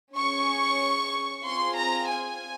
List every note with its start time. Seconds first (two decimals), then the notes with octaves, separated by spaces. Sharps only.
0.16 C#4 G#4 C#6
1.44 C4 F4 G#4 C6
1.76 A#5
2.09 G#5